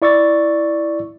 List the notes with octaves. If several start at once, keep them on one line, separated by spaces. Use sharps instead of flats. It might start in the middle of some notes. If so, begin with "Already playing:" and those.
E4 D5 C#6 E6 A6